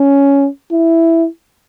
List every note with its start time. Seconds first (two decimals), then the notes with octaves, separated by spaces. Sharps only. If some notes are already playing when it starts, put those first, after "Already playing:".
Already playing: C#4
0.72 E4